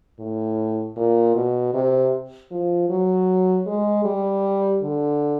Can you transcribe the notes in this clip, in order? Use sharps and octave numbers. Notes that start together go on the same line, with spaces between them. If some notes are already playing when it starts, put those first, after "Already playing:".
A2
A#2
B2
C3
F3
F#3
G#3
G3
D3